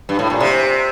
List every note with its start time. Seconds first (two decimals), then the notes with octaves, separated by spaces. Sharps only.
0.09 G2
0.19 A2
0.30 A#2
0.40 C3